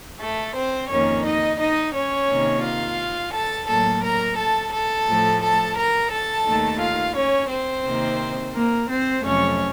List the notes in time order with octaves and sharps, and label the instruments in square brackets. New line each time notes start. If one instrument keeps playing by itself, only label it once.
[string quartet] A3 A4
C4 C5
F2 D#3 A#3 C#4 C#5
D#4 D#5
D#4 D#5
C#4 C#5
C3 D#3 A#3
F4 F5
A4 A5
A2 F#3 A#3 A4 A5
A#4 A#5
A4 A5
A4 A5
A2 F3 A3
A4 A5
A#4 A#5
A4 A5
D#2 D#3 A3
F4 F5
C#4 C#5
C4 C5
C3 D#3 A#3
A#3 A#4
C4 C5
F2 C3 F#3 A3 C#4 C#5